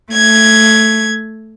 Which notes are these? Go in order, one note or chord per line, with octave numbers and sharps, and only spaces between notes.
A3 G#6